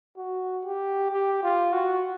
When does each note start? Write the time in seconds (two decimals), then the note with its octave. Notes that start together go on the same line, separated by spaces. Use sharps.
0.17 F#4
0.65 G4
1.11 G4
1.43 F4
1.73 F#4